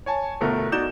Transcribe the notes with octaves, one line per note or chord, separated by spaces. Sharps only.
C#5 G#5 A5
G1 B2 A3 A#4
D#4 F#4 D5 G6 E7